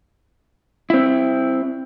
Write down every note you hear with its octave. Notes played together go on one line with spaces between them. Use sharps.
C4 E4